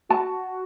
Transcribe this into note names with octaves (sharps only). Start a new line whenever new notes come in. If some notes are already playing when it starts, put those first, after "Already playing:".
F#4 A5